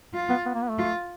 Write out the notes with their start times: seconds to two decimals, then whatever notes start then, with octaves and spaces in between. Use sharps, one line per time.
0.14 F4
0.30 B3
0.46 B3
0.54 A#3
0.62 B3
0.70 A3
0.78 F4